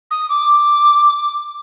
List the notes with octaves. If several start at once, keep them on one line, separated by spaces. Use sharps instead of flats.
D#6
D6